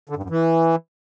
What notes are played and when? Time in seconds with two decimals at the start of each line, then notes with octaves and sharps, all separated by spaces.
0.09 D3
0.16 G2
0.23 F#2
0.30 E3